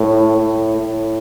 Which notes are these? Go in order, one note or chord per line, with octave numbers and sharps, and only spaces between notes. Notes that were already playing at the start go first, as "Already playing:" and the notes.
Already playing: A2
A2
A2